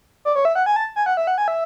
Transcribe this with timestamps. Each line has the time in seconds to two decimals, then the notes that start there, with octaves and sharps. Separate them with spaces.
0.25 D5
0.36 C#5
0.45 E5
0.55 F#5
0.66 G#5
0.76 A5
0.96 G#5
1.06 F#5
1.17 E5
1.27 F#5
1.38 G#5
1.48 E5